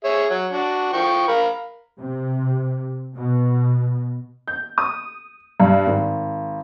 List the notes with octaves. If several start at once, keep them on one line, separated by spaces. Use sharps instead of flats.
G#4 C#5 E5
F#3
D4 F#4
F3 G5 C#6
A#4 F5 B5
C3
B2
G6
D#6
G2
G#1